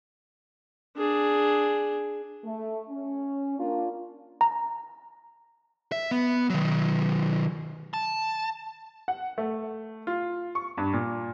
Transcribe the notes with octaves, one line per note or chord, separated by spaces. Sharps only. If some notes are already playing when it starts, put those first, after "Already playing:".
D4 G#4
A3
C#4
A#3 D4 F4
A#5
E5
B3
D#3 F#3
A5
F#5
A3
F4
C#6
G2
A#2